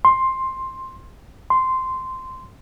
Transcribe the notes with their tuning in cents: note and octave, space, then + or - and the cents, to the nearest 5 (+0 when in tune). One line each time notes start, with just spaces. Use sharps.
C6 +10
C6 -10